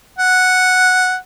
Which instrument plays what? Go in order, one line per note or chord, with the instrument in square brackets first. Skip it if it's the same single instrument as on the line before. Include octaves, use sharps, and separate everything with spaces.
[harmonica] F#5